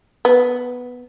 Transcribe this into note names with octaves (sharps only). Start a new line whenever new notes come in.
B3